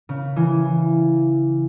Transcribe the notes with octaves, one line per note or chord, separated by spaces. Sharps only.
C#3
E3